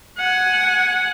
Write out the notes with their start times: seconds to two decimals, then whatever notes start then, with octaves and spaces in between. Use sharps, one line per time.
0.18 F#5 G#5